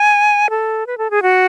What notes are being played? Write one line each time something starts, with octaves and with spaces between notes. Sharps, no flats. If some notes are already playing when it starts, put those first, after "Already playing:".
Already playing: G#5
A4
B4
A4
G#4
F#4